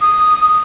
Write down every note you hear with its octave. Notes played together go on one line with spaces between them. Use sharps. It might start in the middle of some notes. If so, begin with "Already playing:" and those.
D#6